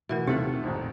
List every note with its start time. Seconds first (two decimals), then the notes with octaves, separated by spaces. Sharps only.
0.09 B2 E3 A3 A#4 E5
0.28 D#2 C3 A3 D#4 F4 A4 F#5
0.63 A#1 F2 G#2